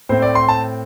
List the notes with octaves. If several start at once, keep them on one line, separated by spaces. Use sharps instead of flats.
A2 A3 C4 C5
D5
C6
A5